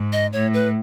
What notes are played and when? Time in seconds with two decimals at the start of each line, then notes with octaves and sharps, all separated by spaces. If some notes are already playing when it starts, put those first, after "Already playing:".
Already playing: G#2
0.13 D#5
0.33 A2 C#5
0.54 B4